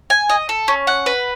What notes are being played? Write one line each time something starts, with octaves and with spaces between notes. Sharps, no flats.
G#5
D#5
A4
C#4
F#5
B4